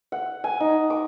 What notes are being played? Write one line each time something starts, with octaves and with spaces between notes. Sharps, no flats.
F#5
G#5
D#4
D6